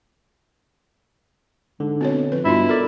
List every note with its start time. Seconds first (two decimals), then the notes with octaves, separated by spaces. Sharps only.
1.80 G#2 D3
2.01 B2 C4 D4 C#5
2.32 F2 B4
2.45 G2 B2 D4 E4 F4
2.69 A4 A#4 D5